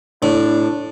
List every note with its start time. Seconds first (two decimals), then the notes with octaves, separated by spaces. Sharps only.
0.22 A2 D4